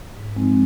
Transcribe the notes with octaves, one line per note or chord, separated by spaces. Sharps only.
G#2
F3 G#3 C4 D#4